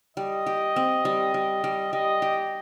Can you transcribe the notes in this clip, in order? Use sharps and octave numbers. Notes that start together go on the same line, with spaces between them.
G3 D#5
G4
C4
G3
G3
G3
G3 D#5
G4